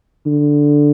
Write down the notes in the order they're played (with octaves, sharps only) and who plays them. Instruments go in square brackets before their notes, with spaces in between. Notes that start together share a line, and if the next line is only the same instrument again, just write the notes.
[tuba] D3